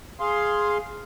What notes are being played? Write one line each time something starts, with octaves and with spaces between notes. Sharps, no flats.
G#4 F5 C6